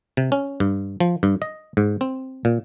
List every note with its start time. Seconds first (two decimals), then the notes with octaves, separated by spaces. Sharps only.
0.17 C3
0.32 C#4
0.60 G2
1.00 F3
1.23 G2
1.42 D#5
1.77 G#2
2.01 C4
2.45 A#2